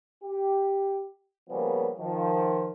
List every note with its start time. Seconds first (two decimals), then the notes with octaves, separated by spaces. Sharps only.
0.23 G4
1.49 C#3 F3 G3 A#3 B3
1.99 D#3 F3